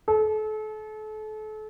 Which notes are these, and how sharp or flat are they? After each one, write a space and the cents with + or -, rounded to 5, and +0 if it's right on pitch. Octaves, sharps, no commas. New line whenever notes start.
A4 -35